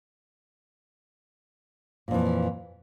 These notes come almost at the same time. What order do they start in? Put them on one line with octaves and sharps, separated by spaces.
A#2 F2 E3